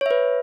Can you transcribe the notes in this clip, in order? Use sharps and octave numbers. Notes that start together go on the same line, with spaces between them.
B4 C#5 E5